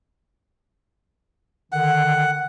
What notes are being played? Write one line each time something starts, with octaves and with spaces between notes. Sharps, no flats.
D3 D#3 F#5